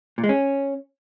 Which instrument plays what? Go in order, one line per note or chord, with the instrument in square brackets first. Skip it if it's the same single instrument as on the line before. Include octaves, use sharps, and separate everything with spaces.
[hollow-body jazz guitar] A#2
G#3
C#4